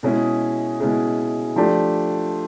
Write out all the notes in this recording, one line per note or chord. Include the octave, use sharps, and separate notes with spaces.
B2 G#3 C#4 E4 G#4
B2 G#3 C#4 E4 G#4
F3 A3 D4 G4